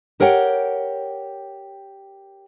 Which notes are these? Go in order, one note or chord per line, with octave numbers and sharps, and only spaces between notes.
G4 A#4 C#5 F#5 G5